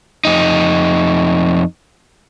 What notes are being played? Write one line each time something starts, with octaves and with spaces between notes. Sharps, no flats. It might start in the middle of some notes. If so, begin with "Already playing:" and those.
F2 D#4